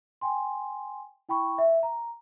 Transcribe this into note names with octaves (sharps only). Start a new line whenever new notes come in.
G5 G#5 C6
E4 G5 B5 C#6
E5
A#5